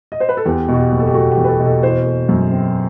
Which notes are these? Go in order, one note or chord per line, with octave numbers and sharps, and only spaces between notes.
D#5
C5
B4
A4
E2 G4
B2
F#4
G4
F#1
A4
G4
A3 F#4
G4
E2
B4
A4
B2
A4
E3 C5
A3
F#2
C4